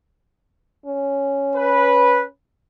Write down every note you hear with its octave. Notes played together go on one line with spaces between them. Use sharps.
C#4
B4